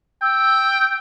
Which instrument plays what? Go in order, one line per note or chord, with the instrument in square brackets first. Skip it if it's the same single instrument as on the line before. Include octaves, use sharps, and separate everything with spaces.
[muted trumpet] G5 [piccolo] E6